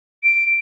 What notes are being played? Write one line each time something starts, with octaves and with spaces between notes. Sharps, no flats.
D7